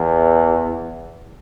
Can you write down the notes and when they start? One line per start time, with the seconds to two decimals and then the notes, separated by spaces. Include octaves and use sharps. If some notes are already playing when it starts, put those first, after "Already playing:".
Already playing: E2